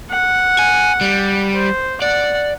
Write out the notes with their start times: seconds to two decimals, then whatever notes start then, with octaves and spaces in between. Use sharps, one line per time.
0.11 F#5
0.59 G#5
1.01 G3
1.54 C5
2.02 D5 F#5